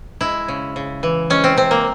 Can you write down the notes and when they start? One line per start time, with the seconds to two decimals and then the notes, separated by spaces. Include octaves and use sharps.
0.21 G#3 E4
0.48 C#3
0.76 C#3
1.03 E3
1.30 G#3 C#4
1.44 C4
1.57 C3 C4
1.71 A#3